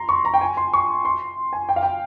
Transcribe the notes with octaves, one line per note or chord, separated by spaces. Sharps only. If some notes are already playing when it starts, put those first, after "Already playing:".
Already playing: A#5 C6
C#6
A#5
G5
G#5
C6
C#6
C6
G#5
G5
F5
G5